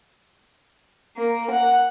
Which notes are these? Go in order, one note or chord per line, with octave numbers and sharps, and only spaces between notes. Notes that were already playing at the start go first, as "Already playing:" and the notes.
A#3
F#5